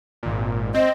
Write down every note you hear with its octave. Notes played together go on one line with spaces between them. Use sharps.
G#1 A#2
C4 D#5